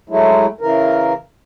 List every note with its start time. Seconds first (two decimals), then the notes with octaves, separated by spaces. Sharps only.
0.10 F#3 G#3 A3 E4
0.61 C#3 E3 A#4